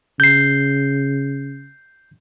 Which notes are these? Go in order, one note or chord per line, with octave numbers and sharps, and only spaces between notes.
C#3 G6 C7